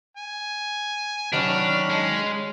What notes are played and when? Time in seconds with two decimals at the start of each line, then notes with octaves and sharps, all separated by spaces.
0.17 G#5
1.32 D#3 F#3 C#4 D4 F#4 B5 F6
1.90 G#3